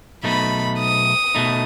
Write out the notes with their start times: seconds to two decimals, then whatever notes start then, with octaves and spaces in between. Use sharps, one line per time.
0.24 B1 B2 A3 D#4 B5
0.79 D#6
1.35 B2 A3 D#4